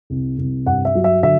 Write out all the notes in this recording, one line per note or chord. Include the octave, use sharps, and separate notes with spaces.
C2
C2
G2 F#5
E5
F#3
E5
D3 E5